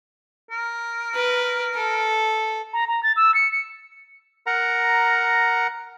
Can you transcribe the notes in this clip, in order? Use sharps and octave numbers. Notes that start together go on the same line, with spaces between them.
A#4
B4
A4
A#5
A#5
A6
E6
C#7
C#7
A#4 F#5 A#5